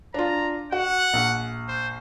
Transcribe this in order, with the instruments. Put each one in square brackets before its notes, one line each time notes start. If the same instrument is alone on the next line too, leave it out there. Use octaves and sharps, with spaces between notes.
[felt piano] D4 F4 [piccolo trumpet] A#5
[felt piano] F#4 [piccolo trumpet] F#5
[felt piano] A#1
[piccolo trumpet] C5